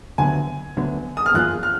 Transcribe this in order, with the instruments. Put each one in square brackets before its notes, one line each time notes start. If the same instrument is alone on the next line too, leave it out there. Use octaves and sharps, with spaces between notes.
[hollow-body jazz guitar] D2 D3 F#3 B3 [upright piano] G#5
[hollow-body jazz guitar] D2 D3 F#3 B3
[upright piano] D#6
F6
[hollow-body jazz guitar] F#2 F3 A#3 F4 G#4 [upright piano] F#6
[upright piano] F6